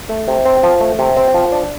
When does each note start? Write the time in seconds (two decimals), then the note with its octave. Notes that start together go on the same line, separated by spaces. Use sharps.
0.09 A3
0.28 C3
0.45 C4
0.63 F3
0.81 A3
0.99 C3
1.17 C4
1.34 F3
1.52 D4